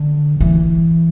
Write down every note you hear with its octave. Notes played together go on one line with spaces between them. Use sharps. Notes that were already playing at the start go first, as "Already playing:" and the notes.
Already playing: D3
E3